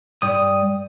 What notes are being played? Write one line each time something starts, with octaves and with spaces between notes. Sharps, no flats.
G2 G3 D#6